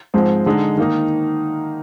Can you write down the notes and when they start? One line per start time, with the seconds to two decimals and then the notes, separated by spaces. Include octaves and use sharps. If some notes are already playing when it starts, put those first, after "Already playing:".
0.14 G#2 F3 G#3 C4
0.46 D3 G#3 D#4
0.77 D#3 A#3 D#4